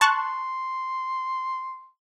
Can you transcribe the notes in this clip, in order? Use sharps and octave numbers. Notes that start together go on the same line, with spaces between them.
A5 C6 C#6 F#6